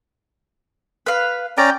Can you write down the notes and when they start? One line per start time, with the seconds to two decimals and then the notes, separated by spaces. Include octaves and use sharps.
1.06 B4 F5
1.58 C#4 D5 G5 A#5